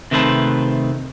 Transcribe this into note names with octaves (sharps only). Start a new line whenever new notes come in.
C3 D#3 A3 B4 C5 A5